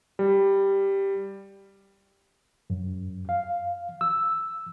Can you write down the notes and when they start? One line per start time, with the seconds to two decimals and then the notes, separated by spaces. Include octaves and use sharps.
0.19 G3
2.70 F#2
3.29 F5
4.01 E6